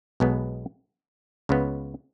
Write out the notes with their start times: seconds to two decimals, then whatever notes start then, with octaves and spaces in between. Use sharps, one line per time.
0.20 B1 B2 G#3 B3
1.49 C#2 C#3 B3